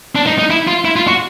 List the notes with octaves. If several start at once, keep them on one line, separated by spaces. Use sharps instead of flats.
D4
D#4
D#4
E4
F4
E4
F4
F#4